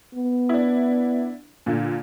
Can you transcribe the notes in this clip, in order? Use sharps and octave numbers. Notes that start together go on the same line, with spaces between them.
B3
D4 E4
A#2 D3